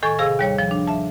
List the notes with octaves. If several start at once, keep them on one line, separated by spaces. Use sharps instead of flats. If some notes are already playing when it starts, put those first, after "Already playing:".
A2 D#3 A4 G#5 C#6 G#6
C3 G#4 F5 E6 A#6
D#2 G3 C#5
F3
D4
E5 A5